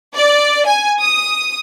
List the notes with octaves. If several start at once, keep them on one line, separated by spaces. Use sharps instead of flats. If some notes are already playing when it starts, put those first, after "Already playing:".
D5
G#5
D#6